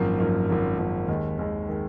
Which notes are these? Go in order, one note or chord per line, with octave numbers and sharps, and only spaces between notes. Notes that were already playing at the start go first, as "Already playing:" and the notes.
Already playing: G#1 F#2 F3 A#3
G#1 F#2 F3 A#3
G#1 F#2 F3 A#3
G#1 F#2 F3 A#3
D#2 D#3 G#3
D#2 D#3 G#3
D#3 G#3